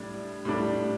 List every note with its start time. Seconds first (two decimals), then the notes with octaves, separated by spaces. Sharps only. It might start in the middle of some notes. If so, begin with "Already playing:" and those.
Already playing: A2 G3 D4
0.45 A2 G3 D4